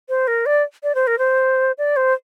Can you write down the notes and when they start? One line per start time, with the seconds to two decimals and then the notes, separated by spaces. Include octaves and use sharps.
0.09 C5
0.28 A#4
0.46 D5
0.83 D5
0.95 C5
1.07 A#4
1.18 C5
1.78 D5
1.96 C5